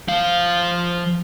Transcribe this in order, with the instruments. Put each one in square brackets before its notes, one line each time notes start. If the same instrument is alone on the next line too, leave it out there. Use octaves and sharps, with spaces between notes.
[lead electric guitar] F3 F5